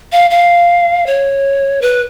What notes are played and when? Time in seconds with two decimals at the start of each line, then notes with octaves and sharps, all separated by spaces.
0.12 F5
0.31 F5
1.07 C#5
1.82 B4